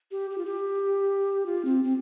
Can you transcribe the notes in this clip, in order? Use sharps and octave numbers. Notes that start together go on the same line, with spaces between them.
G4
G4
F4
G4
F4
C4
C4